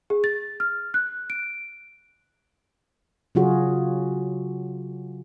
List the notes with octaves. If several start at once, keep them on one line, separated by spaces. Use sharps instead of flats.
G#4
A6
F6
F#6
D7
C#3 F#3 F4 F#4 G#4